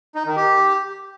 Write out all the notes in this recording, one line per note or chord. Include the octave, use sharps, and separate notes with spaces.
D#4
D#3
G4